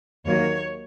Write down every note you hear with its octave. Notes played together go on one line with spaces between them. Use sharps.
D#2 D#3 F#3 A#3 C#5